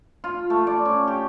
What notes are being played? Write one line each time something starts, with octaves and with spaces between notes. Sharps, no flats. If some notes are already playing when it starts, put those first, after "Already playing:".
F4
A3
D5
C#4
G4